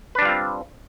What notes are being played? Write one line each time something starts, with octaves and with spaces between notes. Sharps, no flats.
G3 C4 D4 F4 B4